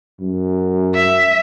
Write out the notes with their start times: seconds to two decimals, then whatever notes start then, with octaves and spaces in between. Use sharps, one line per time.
0.21 F#2
0.95 E5